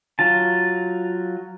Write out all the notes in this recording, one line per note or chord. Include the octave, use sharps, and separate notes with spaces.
F#3 F4 A5